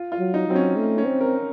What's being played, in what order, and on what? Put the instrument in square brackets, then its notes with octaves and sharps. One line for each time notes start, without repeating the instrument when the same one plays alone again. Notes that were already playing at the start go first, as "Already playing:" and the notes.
Already playing: [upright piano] F4
F4
[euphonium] F#3
[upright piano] D#4
[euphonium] F#3 [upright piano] C4
[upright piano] C#4
[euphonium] A3
[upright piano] C#4
[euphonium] C4
[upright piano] A#4